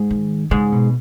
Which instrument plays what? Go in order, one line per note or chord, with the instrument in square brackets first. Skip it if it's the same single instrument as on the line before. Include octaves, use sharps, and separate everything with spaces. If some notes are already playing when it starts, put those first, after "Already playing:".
Already playing: [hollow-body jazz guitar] G#2 G#3
[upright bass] D#3
[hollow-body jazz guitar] G#2 G#3 [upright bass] C#3
[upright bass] B2